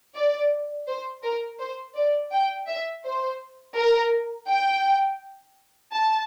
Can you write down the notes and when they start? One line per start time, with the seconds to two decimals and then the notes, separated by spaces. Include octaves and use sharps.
0.15 D5
0.88 C5
1.23 A#4
1.59 C5
1.96 D5
2.31 G5
2.68 E5
3.05 C5
3.77 A#4
4.49 G5
5.93 A5